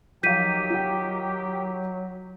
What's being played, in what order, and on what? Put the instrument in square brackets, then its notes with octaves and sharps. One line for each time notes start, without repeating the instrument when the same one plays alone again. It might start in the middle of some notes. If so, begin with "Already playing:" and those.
[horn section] D#3 G4 [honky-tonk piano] F3 F5 [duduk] F#3 [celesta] G6 B6 D#7
[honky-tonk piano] F4 G5